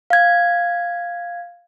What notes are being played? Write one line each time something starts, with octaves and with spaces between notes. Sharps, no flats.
F5 G#6